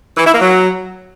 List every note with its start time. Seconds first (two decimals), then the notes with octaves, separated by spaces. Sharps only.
0.16 E3
0.24 E4
0.32 A#3
0.40 F#3